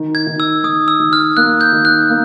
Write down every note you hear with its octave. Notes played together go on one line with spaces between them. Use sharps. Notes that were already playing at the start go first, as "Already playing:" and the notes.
Already playing: D#3
G#6
D#3
E6
D#3 D#6
E6
D#3
F6
A#3 F#6
G6
D#3
F#6
A#3